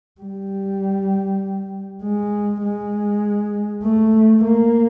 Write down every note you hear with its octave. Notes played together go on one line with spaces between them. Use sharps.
G3
G#3
G#3
A3
A#3